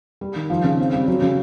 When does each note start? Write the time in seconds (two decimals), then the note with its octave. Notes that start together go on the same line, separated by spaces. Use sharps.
0.21 G3
0.36 D#3
0.50 F3
0.64 C#3
0.79 C4
0.93 G3
1.08 F#3
1.22 C#3